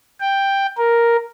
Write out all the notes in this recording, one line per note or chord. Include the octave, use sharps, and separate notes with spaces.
G5
A#4